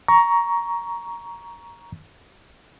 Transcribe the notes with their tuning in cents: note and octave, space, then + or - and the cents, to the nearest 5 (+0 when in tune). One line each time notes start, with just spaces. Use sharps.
A#5 +10 C#6 +15